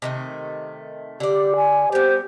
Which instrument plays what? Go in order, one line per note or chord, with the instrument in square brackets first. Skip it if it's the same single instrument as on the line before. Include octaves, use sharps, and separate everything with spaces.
[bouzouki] C3 D#3 A3
[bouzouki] D3 D5 [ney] G4
[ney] G#5
[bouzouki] G3 B3 [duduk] G4 [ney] C5